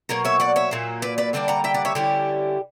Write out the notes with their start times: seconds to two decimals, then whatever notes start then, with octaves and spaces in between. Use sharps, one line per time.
0.09 B2 F#3 A#3 A#4 C#5
0.25 C#5 E5
0.40 D5 F#5
0.56 C#5 E5
0.71 A#2 F#3 A#3
1.02 B4 D5
1.18 B4 D5
1.33 D3 G3 A#3 D4 D5 F#5
1.48 F#5 A#5
1.64 E5 G5
1.74 D5 F#5
1.85 C#5 E5
1.95 D3 G3 C#4 E4 G4